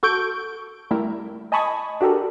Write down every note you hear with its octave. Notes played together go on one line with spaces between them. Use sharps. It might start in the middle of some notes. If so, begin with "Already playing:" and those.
F#4 A4 C#6 G6 D7
G3 A3 E4 A#4
D#5 G#5 A5 B5 C#6 D#6
D4 F#4 G4 A4 A#4